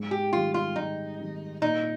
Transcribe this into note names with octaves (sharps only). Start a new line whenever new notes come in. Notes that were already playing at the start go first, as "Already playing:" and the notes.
Already playing: G#2
G4
D#3 G3 F4
F4
G#2 D#4
D#3 G3
A#2 D#4